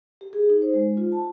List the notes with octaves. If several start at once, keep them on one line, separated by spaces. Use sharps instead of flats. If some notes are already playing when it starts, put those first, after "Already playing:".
G4
G#4
D#4
C5
G#3
F4
A5